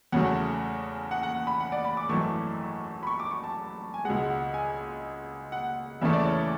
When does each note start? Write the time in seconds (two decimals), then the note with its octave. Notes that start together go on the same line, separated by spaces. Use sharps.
0.12 E2 C#3 F#3 A3 F#5
1.11 F#5
1.23 F#5
1.47 B5
1.60 F#5
1.72 D5
1.85 B5
1.97 D6
2.09 G#1 F#2 E3 A3 C#6
3.03 B5
3.07 C#6
3.20 D6
3.31 C#6
3.44 A5
3.94 G#5
4.05 C#2 B2 G#3 F#5
4.30 F#5
4.54 G#5
5.52 F#5
6.01 E2 C#3 E3 A3 E5
6.13 D5
6.25 C#5